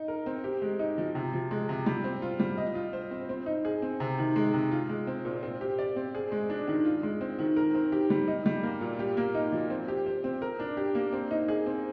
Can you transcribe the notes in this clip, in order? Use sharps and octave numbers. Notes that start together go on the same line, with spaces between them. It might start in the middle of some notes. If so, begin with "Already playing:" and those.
Already playing: D#4
A#4
C4
G4
G#3
D#4
F3
C3
F3
G#3
C3
G3
C4
F4
G3
D#5
F4
C5
C4
C4
D#4
G#4
C4
C3
D#3
G#3
C3
F4
G#3
C4
A#2
C4
G4
D5
C4
G#4
G#3
D4
D#3
F4
G#3
C4
D#3
A#4
C4
G4
G3
D#4
G3
A#3
A#2
G4
A#3
D#4
F3
C4
G4
C5
C4
A#4
D4
G4
A#3
C4
D#4
G#4
C4